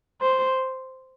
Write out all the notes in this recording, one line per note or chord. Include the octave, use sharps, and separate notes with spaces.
C5